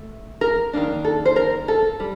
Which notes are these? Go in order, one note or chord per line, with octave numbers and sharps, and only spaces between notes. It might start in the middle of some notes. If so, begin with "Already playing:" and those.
Already playing: A3
A#4
D#3 G3 A#3 D4
A4
C5
A#4
A4
G3